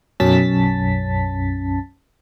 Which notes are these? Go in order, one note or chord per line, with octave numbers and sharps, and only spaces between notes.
B1 F#2 C#4 A5 A6 B6